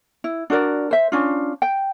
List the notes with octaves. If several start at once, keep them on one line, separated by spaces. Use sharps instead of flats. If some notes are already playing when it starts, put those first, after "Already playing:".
E4
D4 F#4 A#4 D5
C5 E5
C#4 D4 F4
G5